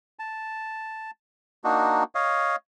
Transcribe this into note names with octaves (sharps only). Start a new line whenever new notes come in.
A5
A#3 D4 D#4 F#4
C#5 D#5 F5